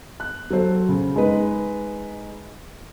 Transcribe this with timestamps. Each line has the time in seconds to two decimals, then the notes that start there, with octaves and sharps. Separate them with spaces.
0.20 F#6
0.50 F#3 A4 C5
0.89 C#3
1.16 G#3 D#4 B4